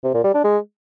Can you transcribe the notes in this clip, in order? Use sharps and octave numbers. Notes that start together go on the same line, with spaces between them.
C3
A#2
G3
D4
G#3